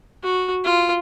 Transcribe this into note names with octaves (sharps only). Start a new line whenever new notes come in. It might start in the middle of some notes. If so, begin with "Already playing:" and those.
F#4
F4